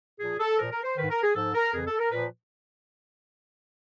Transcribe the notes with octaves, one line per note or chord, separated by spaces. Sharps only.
A#2 F3 G#4
A4
A#2 F3 A#4
A#4
C5
G#2 D#3 B4
A#4
G#4
G#2 F3 A4
A#4
F2 C#3 E3 G#4
A4
A#4
A#2 F3 B4